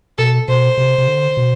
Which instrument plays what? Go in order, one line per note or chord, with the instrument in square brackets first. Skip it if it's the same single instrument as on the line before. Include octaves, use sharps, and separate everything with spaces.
[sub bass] B2 [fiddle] A4
[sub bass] B2 [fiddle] C5
[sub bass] C3
C3
D3
B2